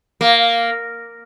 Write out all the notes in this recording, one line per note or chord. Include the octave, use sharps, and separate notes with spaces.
A#3